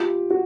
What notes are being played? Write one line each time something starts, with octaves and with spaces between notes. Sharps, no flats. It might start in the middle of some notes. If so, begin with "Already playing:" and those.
Already playing: F4 G4
F#4